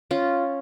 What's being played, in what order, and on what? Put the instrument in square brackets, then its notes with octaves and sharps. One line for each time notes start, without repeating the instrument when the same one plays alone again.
[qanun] C#4 F4